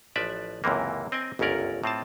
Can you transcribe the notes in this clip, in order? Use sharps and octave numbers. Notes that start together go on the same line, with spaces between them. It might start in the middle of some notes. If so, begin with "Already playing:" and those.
A1 F3 B4 D5 E5
C#2 F#2 C3 E3 A#3
C4 D#5 G5 G#5
G1 C#2 F#2 C#4 A#4 D5
A2 C4 F4 A5